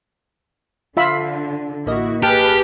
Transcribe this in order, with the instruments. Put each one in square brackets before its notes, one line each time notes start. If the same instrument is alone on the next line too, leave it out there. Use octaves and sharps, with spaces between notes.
[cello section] D3 [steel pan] F4 E5 B5
[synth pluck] A1 A#3 D#5 [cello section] E4 F#4
[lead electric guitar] G4 [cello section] G#4 B4 [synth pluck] A5 F6 F#6